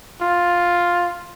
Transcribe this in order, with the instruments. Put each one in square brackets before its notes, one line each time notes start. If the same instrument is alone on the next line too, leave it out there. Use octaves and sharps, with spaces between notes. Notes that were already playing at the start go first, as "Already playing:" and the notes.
[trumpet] F4